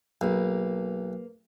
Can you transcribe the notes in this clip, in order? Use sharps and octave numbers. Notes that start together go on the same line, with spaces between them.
B1 A#3 G#4 B4